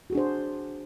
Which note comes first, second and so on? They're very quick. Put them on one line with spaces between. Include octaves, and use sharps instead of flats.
F#4 G#4 D4 C5